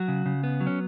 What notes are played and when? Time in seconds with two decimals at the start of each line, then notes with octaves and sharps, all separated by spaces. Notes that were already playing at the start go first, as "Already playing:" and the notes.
Already playing: F#3 F#4
0.08 C#3
0.26 C#3
0.44 B3
0.61 F#3
0.67 C#4